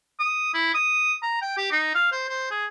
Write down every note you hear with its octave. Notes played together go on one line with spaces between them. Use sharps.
D#6
E4
D#6
A#5
G5
G4
D#4
F5
C5
C5
G#4